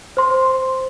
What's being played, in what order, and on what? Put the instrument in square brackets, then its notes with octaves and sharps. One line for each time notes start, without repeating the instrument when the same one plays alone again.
[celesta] C5 C6